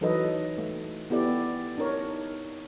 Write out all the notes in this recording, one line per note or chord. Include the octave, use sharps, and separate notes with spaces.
E3 F#3 D#4 A4 B4 D#5
A3
B3 E4 G4 A4 D5
D4 D#4 A#4 C#5